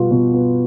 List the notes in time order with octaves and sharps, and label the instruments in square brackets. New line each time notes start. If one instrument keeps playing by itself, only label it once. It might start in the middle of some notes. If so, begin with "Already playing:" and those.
Already playing: [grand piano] B2 G3 B3 [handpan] F4
[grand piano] B2
B3